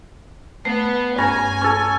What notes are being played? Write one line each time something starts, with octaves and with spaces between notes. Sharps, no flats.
A3 B3
G2 C#4 G#5 A#5
C#4 A4